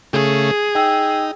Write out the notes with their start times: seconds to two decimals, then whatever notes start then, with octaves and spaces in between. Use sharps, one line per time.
0.13 C#3 A3 G#4
0.75 D#4 G5 E6